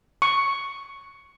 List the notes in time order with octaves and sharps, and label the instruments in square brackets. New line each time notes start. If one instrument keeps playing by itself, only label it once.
[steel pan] C#6